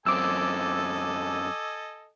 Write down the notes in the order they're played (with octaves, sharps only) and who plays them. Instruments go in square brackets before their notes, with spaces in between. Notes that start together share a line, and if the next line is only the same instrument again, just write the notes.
[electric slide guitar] F#2 C4 [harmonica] A4 D#5 G#5 [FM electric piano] D6 E6